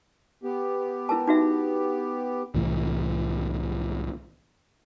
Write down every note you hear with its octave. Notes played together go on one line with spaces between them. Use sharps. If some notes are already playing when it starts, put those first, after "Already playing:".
B3 G4
E4 A#4 A5
D#4 F#4 E5
C2 A2 E3